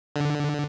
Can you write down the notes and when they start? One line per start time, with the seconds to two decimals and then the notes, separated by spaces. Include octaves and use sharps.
0.16 D3